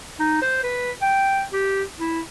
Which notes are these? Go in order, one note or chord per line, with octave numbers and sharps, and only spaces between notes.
D#4
C5
B4
G5
G4
E4